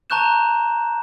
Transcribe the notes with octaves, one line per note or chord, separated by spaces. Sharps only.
A5 A#5 C#6 F#6 G6 E7